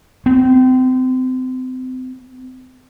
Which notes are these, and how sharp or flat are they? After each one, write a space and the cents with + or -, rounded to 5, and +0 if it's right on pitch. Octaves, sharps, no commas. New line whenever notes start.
C4 -30